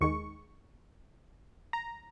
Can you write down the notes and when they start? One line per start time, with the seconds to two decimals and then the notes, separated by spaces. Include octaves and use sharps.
0.01 D#2 D#3 G#3 C#6
1.73 A#5